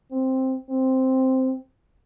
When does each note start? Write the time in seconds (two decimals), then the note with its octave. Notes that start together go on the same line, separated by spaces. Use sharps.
0.11 C4
0.70 C4